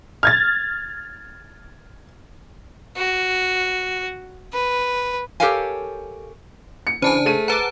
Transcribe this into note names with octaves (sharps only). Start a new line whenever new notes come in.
F6 G#6 A6
F#4
B4
G4 A4 A#4 C#5 F5 G#5
C#7
C#3 E3 D4 C5 G#5 A5
A3 G#4 D#7
B4 F#5 A5 A#5 D6